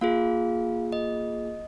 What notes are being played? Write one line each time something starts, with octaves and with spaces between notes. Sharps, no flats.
A#3 F4 G#4 F5
D#5